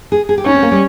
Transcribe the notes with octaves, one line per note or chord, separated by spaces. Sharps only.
G#4
G#4
G4
C#4 D#4
C4
A#3
G3